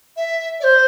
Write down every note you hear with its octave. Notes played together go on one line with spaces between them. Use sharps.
E5
D5
C5